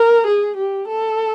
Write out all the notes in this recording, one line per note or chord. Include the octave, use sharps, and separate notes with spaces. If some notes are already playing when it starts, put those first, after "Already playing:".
Already playing: A#4
G#4
G4
A4